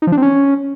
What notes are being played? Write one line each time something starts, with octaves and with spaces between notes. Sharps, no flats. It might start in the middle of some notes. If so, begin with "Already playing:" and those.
D#4
F3
D4
C4
C#4